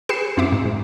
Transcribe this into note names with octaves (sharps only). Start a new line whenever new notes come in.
G4 G#4 B4 C7 C#7 E7
F#2 C4 E4 E5 D6
G#2
G#2